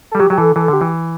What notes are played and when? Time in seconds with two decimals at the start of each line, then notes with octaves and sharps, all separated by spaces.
0.11 G3 A4
0.20 F#3 G4
0.30 F#3 G4
0.38 E3 A4
0.56 E3 A4
0.68 D3 G4
0.81 E3